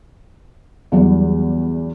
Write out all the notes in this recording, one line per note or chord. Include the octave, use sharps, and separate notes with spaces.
E2 E3 F#3 G3